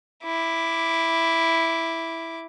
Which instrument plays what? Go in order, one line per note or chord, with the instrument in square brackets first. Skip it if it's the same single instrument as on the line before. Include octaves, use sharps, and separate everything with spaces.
[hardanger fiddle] E4 D6